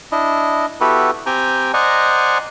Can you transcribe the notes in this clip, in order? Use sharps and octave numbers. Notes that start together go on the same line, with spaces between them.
D4 E4 D#5
B3 E4 F#4 G4 A4 B4
C4 G4 G5 G#5 A#5
C5 D5 D#5 F#5 G#5 A#5